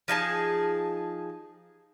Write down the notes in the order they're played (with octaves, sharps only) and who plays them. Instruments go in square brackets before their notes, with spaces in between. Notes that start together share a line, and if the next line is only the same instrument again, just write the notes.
[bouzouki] F3 D#4 G#4 A5